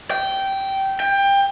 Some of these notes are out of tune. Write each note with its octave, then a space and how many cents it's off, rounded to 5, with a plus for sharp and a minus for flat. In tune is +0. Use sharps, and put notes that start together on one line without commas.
G5 -15
G5 +20